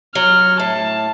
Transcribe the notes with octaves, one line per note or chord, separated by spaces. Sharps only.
F#3 F6
A2 A5